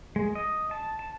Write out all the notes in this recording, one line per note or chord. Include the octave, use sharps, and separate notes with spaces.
G#3
D#5
A5
A5